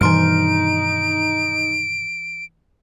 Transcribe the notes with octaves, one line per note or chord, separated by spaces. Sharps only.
G2 B2 D#3 E3 D#4 C6 F6 D7